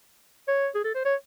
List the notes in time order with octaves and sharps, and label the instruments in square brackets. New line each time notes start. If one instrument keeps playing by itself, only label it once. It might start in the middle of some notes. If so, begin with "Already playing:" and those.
[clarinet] C#5
G#4
A4
C5
C#5